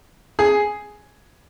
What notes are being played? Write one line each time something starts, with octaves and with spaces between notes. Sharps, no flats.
G#4